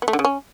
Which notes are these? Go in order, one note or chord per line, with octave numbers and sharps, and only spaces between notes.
B3
A3
D3
C#3
C#4